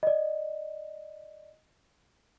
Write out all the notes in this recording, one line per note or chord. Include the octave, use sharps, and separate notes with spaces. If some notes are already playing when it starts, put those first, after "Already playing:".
D5 D#5